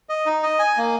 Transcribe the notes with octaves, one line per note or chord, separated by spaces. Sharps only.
D#5
D#4
D#5
G#5
A#3